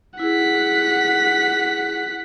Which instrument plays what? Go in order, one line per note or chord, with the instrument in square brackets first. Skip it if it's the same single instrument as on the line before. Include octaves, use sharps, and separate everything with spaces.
[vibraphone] E4 G#4 [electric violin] F#5 B6